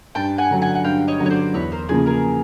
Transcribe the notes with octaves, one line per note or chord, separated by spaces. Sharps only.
G2 G5 A5
F#5 G#5
D3 F#3
F#5 G#5
F#5
G2 F5 G5
C#5 D#5
D3 F#3
C#5
C5 D5
E2 B4 C#5
A#4 C5
C#3 F3 A#3 G#4
G#4 A#4